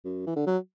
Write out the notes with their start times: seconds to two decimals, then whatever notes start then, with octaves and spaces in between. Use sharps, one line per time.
0.05 F#2
0.27 E3
0.36 D3
0.46 F#3